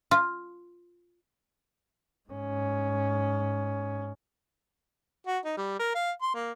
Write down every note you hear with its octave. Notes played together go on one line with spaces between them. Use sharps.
F4
G#2 C#4
F#4
D#4
G3
A#4
F5
C6
A#3